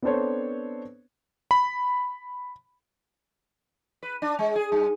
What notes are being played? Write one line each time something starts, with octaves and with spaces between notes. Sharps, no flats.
B3 C4 D4 A4 C5 C#5
B5
B4
D4
G#3
G#4
G2